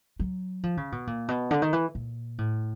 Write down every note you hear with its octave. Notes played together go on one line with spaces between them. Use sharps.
F#3
F3
C#3
B2
A#2
B2
D3
D#3
E3
A#2
A2